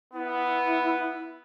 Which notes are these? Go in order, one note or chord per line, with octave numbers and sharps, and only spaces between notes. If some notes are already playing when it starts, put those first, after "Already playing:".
B3 E4